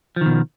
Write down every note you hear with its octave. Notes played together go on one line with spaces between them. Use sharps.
B2 D#3 F3